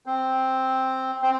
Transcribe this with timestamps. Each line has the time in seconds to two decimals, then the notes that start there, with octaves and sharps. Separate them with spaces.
0.06 C4
1.22 C4